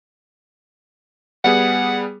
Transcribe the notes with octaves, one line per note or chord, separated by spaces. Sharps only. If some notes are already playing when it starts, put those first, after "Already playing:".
G3 B3 G#4 F#5